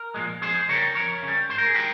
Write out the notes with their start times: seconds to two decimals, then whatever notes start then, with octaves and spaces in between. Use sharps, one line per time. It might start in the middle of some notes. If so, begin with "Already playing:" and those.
Already playing: A#4
0.14 A#2 F3 G#3
0.41 F2 G#4 C5
0.69 C#3 G3 A#4 C#5
0.95 F2 A#4 C#5
1.22 C#3
1.28 G3
1.49 G#2 C5
1.58 A#4
1.66 G#4
1.74 D#3 G#3 G4 A#4